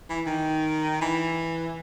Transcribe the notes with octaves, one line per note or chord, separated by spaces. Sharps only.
E3
D#3
E3